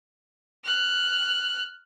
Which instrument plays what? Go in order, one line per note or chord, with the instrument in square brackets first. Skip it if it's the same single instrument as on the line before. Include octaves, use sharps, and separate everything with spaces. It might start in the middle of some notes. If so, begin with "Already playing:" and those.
[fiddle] F6 F#6